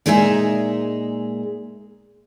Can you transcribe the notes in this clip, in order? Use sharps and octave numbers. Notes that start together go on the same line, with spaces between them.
A#2 G#3 D#4 G#4 A#4 E5